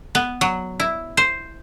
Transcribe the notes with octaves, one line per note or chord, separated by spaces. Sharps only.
B3
F#3
E4
C5